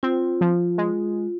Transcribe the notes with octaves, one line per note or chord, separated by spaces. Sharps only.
C4 F4
F3
G#3